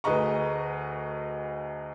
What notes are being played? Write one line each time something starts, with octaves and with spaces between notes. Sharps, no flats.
D2 G#4 B4 D#5 A#5 C#6